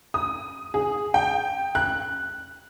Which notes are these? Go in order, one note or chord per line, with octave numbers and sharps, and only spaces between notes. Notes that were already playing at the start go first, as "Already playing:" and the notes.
D#6
G#4
G5
F#6